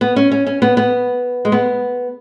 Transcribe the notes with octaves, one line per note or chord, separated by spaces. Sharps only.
B3
C#4
C#4
C#4
B3
B3
G#3
B3